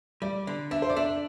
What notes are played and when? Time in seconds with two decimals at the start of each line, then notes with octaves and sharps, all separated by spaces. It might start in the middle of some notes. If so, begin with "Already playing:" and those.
0.22 G3 D5
0.47 D3
0.71 D4 E5
0.82 C5
0.90 D5
0.96 D4 E5